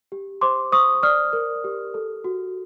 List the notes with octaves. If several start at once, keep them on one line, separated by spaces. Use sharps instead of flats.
G4
C5 C6 D6
C5 C#6 D#6
D5 D#6 F6
A#4
G4
A4
F#4